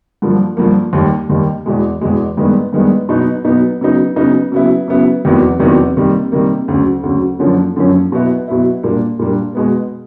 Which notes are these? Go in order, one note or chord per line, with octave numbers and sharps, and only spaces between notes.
G2 D3 F3 A#3
G2 D3 F3 A#3
D#2 D#3 G3
D#2 D#3 G3
E2 B2 G#3
E2 B2 G#3
G2 D#3 G#3 B3
G2 D#3 G#3 B3
B2 F#3 B3 D#4
B2 F#3 B3 D#4
C#3 F#3 B3 D#4
C#3 F#3 B3 D#4
C#3 F#3 B3 E4
C#3 F#3 B3 E4
E2 C3 D#3 F#3 B3
E2 C3 D#3 F#3 B3
C3 D#3 G3 A#3
C3 D#3 G3 A#3
D2 C#3 F#3
D2 C#3 F#3
F#2 D3 F3 A#3 C#4
F#2 D3 F3 A#3 C#4
B2 F#3 B3 E4
B2 F#3 B3 E4
A#2 G3 A#3 D4
A#2 G3 A#3 D4
B2 G#3 B3